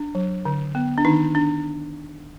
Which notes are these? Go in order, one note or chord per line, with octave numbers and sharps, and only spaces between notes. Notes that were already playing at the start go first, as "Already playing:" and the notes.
Already playing: D4
F#3
D3
B3
D4
D#3 D#4
D4